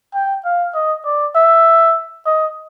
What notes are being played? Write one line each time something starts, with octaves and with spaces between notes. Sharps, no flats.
G5
F5
D#5
D5
E5
D#5